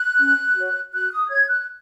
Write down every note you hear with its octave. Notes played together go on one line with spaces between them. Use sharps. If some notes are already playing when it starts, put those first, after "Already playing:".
Already playing: F#6
C#4
F#4 C#5
F#4 F#6
D#6
C#5 G#6
F#6